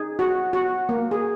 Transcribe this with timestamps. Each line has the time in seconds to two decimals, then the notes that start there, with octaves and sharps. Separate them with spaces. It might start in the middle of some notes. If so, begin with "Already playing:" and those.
Already playing: D#4 G#4
0.19 F#4
0.53 F#4
0.89 A#3
1.11 G#4